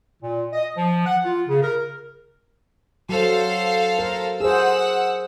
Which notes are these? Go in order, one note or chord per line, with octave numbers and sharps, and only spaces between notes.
A#2
D#5
F3
F#5
F4
C#3
A#4
F#3 A4 C5 F5
A#4
G#4 C5 F#5 E6